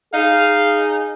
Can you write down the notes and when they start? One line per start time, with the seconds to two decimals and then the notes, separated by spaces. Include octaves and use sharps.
0.14 D#4 G#4 F5